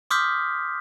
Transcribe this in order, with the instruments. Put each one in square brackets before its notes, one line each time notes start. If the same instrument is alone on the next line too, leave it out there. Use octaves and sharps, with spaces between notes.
[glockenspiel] C6 D6 D#6 F6 G6 B6